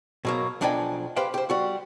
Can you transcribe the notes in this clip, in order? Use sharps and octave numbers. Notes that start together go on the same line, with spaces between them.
B2 F#3 A#3
B1 F3 D4 D#4 G5 G#5
G4 B4 C5 F5 G5
G4 C5
G3 F#4